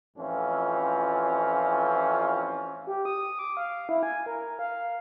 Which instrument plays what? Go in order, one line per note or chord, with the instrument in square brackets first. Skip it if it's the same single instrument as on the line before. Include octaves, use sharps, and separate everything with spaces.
[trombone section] A1 F2 E3 C4 C#4 F4
[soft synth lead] G4
D#6
D6
F5
E4
G#5
A#4
F5